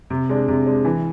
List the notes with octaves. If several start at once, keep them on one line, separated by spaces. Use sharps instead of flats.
C3
G#3 D4
C3
G#3 D4
E3